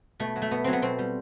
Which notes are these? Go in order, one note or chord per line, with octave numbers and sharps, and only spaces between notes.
B2 A3
F#3
A3
B2 B3
F#3 C4
B3
B2 C4
G3